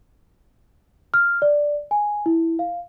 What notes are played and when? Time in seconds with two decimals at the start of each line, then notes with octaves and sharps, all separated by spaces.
1.14 F6
1.42 D5
1.91 G#5
2.26 E4
2.59 F5